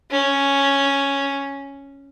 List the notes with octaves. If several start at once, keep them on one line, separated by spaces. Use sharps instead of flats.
C#4